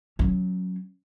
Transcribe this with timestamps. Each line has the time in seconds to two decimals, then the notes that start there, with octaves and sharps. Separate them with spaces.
0.19 F#3 C#4